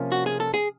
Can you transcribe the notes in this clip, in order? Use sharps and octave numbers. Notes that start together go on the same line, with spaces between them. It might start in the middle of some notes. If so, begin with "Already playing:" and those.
Already playing: C3 F3 A#3 C#4 F4
F#4
G#4
A4
G#4